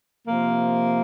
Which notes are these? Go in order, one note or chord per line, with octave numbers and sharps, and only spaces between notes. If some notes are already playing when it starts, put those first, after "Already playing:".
C3 F3 A#3